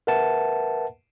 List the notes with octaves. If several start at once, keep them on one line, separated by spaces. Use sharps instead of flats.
A#4 B4 E5 F#5 A5